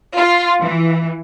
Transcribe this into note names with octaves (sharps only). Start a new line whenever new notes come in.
F4
E3